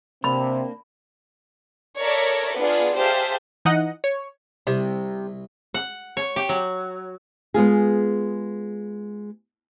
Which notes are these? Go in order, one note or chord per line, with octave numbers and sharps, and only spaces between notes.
C3 A#3 C4 D4 B5
A4 A#4 C#5 D5 E5 A#5
B3 D4 F4 G#4
G4 G#4 C5 E5 F5 A5
E3 D#4 D#5 F#5
C#5
C2 C3
F#5
C#5
G4
F#3
G#3 B3 F4 G#4